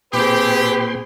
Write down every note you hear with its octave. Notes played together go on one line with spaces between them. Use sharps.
A#2 C4 G4 G#4 B4 G5 C6